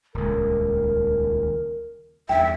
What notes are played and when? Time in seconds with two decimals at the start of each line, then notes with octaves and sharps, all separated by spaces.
0.14 D#1 C#2 A#4
2.29 E2 G2 E5 G5